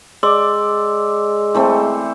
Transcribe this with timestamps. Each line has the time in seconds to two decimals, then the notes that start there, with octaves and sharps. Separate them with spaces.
0.23 G#3 D5 C6 D6 E6
1.55 E3 A3 C4